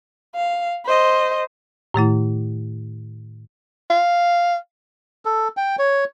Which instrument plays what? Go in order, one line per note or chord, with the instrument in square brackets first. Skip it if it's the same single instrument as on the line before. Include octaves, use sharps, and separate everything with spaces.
[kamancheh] F5
C5 D#5
[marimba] A2 D#3 A3 E4
[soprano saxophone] F5
[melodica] A4
G5
C#5